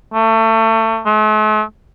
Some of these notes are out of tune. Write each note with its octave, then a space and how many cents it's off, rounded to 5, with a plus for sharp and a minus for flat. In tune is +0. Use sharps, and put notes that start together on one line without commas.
A3 +30
A3 -45